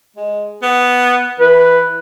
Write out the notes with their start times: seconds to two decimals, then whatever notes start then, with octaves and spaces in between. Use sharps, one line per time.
0.16 G#3
0.63 B3
1.40 E3 B4